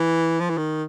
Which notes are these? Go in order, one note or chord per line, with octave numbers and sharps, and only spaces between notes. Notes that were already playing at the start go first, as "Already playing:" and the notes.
Already playing: E3
F3
E3
D#3